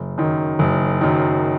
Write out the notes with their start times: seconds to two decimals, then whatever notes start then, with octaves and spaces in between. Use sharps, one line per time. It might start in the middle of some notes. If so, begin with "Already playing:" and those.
Already playing: F#1
0.18 F#2 D#3
0.59 F#1
1.01 F#2 D#3